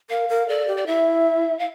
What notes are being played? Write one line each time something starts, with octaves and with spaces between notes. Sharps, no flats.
A#4 F5
A#4
A4 D5
G4
D5
E4 E5
F5